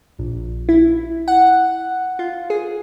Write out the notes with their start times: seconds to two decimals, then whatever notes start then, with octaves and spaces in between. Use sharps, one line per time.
0.19 A#1
0.69 E4
1.28 F#5
2.19 F4
2.50 G#4